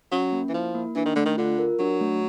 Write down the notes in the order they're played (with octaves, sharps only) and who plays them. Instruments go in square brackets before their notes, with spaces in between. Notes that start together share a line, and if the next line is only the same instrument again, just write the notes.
[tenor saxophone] F#3 [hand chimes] C#4
[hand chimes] A#3
[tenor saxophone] E3
[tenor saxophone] F3 [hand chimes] E4
[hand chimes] A#3
[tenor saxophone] E3 [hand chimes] D4
[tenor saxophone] D#3
[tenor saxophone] D3 [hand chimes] A3
[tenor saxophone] D#3
[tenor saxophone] D3 [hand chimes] F4
[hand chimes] A#4
[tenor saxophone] F#3 [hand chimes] D4
[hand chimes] A3